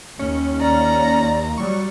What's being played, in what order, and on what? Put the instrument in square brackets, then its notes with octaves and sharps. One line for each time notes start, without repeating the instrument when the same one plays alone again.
[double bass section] D#2 [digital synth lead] C#4
[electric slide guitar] D5 [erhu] A#5
[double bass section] F#3 G3 [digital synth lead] C#6